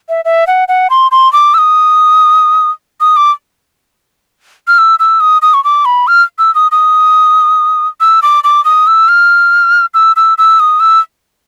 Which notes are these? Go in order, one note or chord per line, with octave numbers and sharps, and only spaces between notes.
E5
E5
F#5
F#5
C6
C6
D6
E6
D#6
D#6
D6
F6
E6
E6
D#6
D#6
C#6
D6
B5
F6
E6
D#6
D#6
E6
D6
D6
D#6
E6
F6
E6
E6
E6
D#6
E6